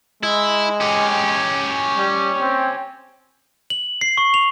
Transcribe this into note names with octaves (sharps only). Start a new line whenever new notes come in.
G#3 E4
C#4 G4
G3
C4
F#7
C7
C#6
F7